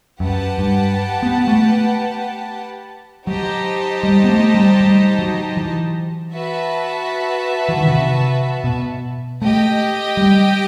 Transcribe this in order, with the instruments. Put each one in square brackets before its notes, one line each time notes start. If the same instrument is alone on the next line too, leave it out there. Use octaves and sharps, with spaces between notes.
[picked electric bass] F#2 [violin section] G4 B4 F#5 A5
[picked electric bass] G2
B3
A3
[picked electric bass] F#3 [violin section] D#4 G4 C5 D#5 A5
[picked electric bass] G3
B3
A3
G3
G3
F#3
E3
[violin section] F#4 B4 E5 A5
[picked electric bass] E3
D#3
C3
B2
[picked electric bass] A3 [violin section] G4 D#5 G5
[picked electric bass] G3